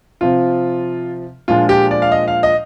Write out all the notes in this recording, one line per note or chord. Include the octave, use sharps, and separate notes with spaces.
C3 F3 C4 F4
A#2 F3 G#3 D4 F4
G4
D5
F5
D#5
F5
D#5